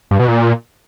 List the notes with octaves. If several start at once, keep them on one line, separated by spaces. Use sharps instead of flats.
G2
B2
A#2